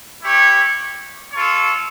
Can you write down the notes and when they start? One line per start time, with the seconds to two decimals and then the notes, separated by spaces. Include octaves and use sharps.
0.21 E4 G4 C#5
1.32 F4 A4 C#5